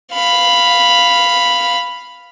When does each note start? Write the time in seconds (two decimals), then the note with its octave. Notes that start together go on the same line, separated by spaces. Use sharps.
0.14 F5 B5